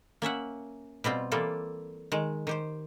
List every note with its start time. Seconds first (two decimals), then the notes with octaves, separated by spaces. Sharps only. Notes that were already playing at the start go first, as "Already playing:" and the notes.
0.22 A#3 C#4 E5 F#5
1.04 B2 G3 C4 F4
1.32 E3 G3 A#3 F4 A4
2.12 D#3 G#3
2.47 D#3 G4 C5